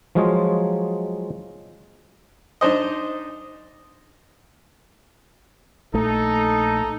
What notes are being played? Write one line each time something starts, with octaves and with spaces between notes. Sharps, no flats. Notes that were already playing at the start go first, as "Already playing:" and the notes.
F3 F#3 G#3 F4 C#5 D#5
D4 D#4 C5 D#5
A#1 A3 D#4 A4